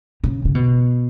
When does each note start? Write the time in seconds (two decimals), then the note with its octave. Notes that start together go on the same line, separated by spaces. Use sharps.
0.24 C#3
0.45 C#3
0.55 B2